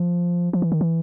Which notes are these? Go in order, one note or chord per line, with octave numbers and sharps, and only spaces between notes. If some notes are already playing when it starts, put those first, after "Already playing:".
Already playing: F3
F3
E3
D#3
E3